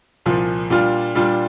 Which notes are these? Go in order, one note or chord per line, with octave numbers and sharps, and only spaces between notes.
C2 A#2 F3
A#2 G3 D4 F4
A#2 G3 D4 F4